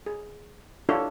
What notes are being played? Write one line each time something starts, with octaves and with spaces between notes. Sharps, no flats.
G#4
D4 E4 F4 G4 A4 C#5